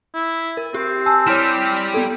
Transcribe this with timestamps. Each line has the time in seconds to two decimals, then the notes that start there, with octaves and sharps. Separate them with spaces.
0.14 E4
0.57 A#4
0.74 C4 G4
1.06 G#5 A5 E6
1.27 G3 E4 G4 C#5 C6 F6 E7
1.94 B3 A4